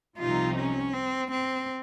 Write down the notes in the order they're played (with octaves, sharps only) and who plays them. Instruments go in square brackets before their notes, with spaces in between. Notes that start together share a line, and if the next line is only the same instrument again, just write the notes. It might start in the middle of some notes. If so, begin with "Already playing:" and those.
[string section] C2 C3 F3 C4 D#4 [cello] F4
[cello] C#4
C4
C4